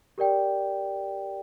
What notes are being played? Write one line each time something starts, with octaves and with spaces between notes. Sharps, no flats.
G4 A#4 D5 G5